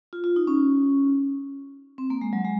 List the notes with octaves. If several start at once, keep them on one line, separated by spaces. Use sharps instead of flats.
F4
F4
D#4
C#4
C4
A#3
G#3
F#3
G#3